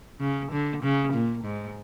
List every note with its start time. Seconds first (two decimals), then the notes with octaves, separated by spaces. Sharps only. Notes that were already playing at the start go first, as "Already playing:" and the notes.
0.20 C#3
0.52 D3
0.83 C#3
1.13 A#2
1.44 G#2